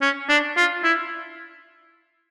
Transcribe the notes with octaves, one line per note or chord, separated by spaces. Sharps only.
C#4
D4
F4
E4